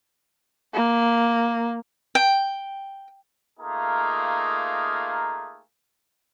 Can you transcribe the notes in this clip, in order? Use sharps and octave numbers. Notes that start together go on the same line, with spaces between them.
A#3
G5
A3 A#3 D#4 F4 G#4 A#4